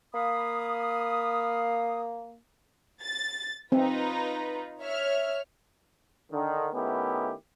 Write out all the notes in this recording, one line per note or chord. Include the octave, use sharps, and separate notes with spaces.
A#3 F5 B5 D#6
A6
C4 D#4 F4 B4
C#5 E5 F6
D3 D#3
D#3 A3 B3 C#4 E4 G4